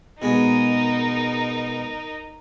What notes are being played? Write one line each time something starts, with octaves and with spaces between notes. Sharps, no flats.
B2 G#3 D#4 A#4